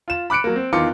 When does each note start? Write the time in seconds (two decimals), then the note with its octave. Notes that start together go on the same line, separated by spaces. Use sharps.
0.08 F4 E7
0.30 B5 D6 F#6 C#7 D7
0.44 F#3 A#3
0.56 C4
0.73 E2 D#3 F4 C6 D6 C#7